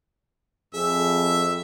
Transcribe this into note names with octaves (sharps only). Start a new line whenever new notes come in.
F2 G#4 E5